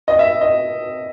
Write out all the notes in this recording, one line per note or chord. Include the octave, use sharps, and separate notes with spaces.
D#5
E5
D#5